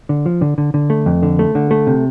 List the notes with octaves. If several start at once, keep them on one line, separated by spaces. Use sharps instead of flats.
D3
F3
D3
D3
D3
A3
F2
D3
A3
D3
A3
C3